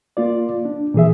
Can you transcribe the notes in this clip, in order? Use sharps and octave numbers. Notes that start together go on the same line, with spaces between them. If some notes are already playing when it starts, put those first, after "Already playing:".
A#3 F4 D5
D4
A#2 E3 G#4 E5